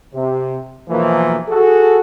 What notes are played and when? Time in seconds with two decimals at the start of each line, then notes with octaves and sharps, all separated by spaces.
0.14 C3
0.89 B1 E3 F3 A#3
1.49 F#4 G#4 A4